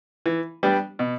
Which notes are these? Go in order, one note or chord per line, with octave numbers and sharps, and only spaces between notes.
E3
G3 B3 D4 G4
B2